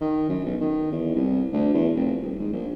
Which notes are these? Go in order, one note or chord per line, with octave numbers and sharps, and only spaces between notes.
D#3
F#2
B1
D#3
E2
C2
D2
E2
F1
D#1
G#2
A#1